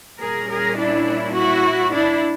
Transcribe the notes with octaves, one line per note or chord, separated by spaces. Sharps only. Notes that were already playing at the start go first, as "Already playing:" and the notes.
A#2 G3 A#3 C#4 G#4 A#4
G#4 A#4
D4 E4
E4 F#4
D4 E4